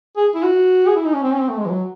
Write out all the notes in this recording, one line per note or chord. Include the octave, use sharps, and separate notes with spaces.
G#4
E4
F#4
G#4
E4
D#4
C#4
C4
C#4
C4
A3
G#3
E3
F#3